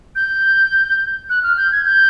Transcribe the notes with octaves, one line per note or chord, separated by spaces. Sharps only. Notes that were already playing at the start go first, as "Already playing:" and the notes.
G6
F#6
F6
G6
G#6
G6